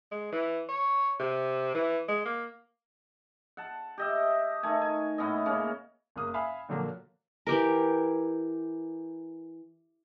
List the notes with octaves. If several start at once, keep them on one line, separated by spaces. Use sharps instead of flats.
G#3
E3
C#5
C3
E3
G#3
A#3
F#5 A5
G4 D#5 E5
D#3 A3 G#5
G#5
A2 B3 C#4 D#5
C#3 A#3 C#4
F#1 A#3 D#6
E5 F5 G#5 B5 D#6
A#2 D3 F3 F#3 A#3
E3 G4 A#4